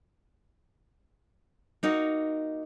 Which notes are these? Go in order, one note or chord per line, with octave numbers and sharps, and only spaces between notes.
A#3 D#4 F#4